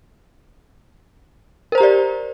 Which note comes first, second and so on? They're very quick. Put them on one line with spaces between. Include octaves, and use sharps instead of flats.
A#4 C5 A#5 G4 D5